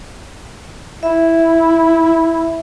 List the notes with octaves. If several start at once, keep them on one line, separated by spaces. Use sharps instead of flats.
E4 E5